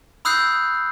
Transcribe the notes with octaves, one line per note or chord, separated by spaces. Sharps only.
B5 D#6 E6 F#6 G6 C7